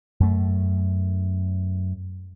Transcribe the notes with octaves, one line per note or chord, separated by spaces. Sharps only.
F#2 A3